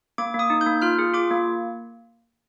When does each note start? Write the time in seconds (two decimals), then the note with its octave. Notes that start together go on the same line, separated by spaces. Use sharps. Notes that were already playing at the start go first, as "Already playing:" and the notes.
0.18 A#3 D6
0.34 A#3 D#6
0.50 D#4
0.61 G6
0.66 A#3
0.82 F4 F6
0.99 G#4
1.14 F4 D6
1.31 A#3